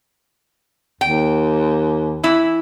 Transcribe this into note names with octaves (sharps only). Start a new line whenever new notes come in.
D#2 G5
E3 E4